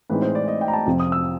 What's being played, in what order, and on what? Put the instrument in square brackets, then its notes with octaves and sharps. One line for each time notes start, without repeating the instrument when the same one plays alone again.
[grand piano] A2 E3 G#3 C4 D#4 B4
C5
D5
D#5
G5
A#5
A5
F2 C3 F3
D#6
E6